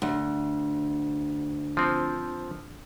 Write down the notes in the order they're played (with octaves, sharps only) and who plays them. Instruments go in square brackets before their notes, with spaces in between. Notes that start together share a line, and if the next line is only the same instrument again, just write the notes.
[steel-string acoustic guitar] D2
[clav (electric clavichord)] F3 C4